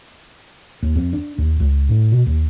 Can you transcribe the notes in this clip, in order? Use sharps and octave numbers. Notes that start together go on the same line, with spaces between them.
D#2
F2
D4
D#2
C#2
A2
B2
D#2